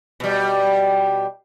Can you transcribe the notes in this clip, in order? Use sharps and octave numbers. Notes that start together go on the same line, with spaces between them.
B2 G3